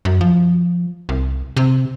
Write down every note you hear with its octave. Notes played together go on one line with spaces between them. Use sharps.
F#2
F3
C2
C3